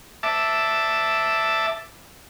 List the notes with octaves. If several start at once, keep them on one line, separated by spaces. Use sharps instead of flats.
E5 A5 D6